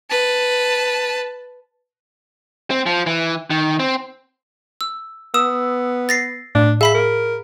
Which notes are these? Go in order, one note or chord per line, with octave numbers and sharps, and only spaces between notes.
B4 A5
C4
F3
E3
D#3
C4
E6
B3 D#6 E6
A6 A#6 C7
A2 D4
G#4 E5 F5 B5 B6
A#4